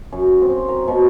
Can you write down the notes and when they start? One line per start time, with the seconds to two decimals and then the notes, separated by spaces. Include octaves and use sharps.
0.12 F#2
0.42 C4
0.68 A#4
0.88 B2